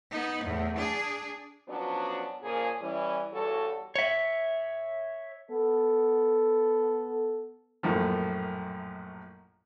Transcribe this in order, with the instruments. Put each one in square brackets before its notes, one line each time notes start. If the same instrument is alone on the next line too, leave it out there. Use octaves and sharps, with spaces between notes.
[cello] B3 D#4
E2 A2
D4 G#4
[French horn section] F3 F#3 B3 C#4 D4
A#2 C#3 F3 A#3 G#4
E3 G3 C#4
E2 G2 G3 F#4 A4 C#5
[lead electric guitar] C#5 E5
[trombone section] B3 A4
[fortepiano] A#1 F#2 A2 F3